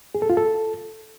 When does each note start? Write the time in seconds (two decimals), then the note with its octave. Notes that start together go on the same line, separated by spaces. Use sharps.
0.15 G#4
0.22 A4
0.30 F4
0.37 A4